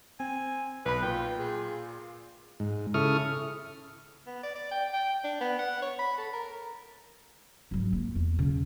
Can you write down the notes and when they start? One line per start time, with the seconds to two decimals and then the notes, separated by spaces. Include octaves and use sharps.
0.20 C4 G#5
0.86 B1 B4 B5
1.02 A#2 F4 G5
1.39 G#4
2.60 G#2
2.94 C#3 E4 A4 C#6 D#6 F6
4.27 B3
4.43 D5
4.55 D5
4.71 G5
4.93 G5
5.24 D4
5.41 B3
5.59 F#5
5.82 C#5
5.99 B5
6.18 A4
6.33 A#4
7.71 G#1 F#3
7.92 A#3
8.15 E2
8.39 C#3